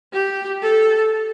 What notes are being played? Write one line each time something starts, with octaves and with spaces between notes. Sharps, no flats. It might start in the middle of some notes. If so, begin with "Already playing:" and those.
G4
A4